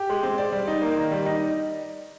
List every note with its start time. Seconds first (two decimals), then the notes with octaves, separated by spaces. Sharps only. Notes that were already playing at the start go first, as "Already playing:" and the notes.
Already playing: G4
0.10 G#3
0.23 C4
0.38 D5
0.53 G3
0.68 D#4
0.82 A#3
0.97 D#3
1.12 G3
1.26 D#4